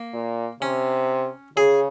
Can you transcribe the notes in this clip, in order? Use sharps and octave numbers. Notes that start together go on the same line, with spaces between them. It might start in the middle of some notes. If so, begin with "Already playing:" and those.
Already playing: A#3
A#2
C3 C#4
C#3 G#4